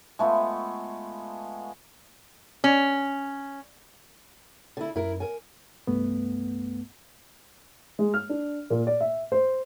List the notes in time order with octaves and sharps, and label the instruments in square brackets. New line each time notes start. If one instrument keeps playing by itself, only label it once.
[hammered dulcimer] G#3 A3 B3 F4
[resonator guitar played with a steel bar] C#4
[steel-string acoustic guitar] D3 E4
[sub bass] F#2 [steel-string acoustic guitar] E4 A#4
[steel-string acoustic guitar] A#4 G#5
[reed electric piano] C2 G2 A3 B3
[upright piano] G#3
F6
D4
A#2
D5
E5
C5